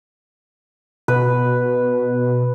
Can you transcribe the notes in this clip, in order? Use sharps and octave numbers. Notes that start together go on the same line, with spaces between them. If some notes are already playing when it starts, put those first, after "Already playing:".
B2 B4